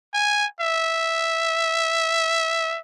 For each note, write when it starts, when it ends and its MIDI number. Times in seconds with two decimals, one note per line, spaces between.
0.14 0.46 80
0.61 2.78 76